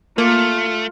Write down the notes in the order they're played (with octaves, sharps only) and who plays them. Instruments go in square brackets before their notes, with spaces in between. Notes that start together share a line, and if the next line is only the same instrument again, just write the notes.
[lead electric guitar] A3 [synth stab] A#3 [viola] F4